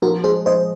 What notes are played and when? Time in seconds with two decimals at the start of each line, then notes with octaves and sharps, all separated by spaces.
0.02 F3 F#4 A#4
0.24 G#3 G#4 C5
0.46 F3 C5 D#5